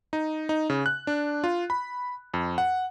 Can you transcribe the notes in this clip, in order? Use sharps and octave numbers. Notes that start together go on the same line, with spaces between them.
D#4
D#4
C#3
F#6
D4
F4
B5
F2
F#5